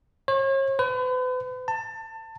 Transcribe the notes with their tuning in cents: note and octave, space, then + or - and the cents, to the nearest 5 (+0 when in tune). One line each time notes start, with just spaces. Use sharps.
C#5 -40
B4 +40
A5 +25